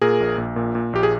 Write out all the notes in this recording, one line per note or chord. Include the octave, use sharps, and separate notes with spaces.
A#2 G#4 A#4
A#1
A#1
A#2
A#2
A#1 G4
G#4